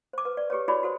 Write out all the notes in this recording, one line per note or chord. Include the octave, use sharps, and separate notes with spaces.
C5 D6
B4
D5
G4 G#4 B4 C#5
E4 F#4 G#4 C#5 D5 B5
F#4 A4 C5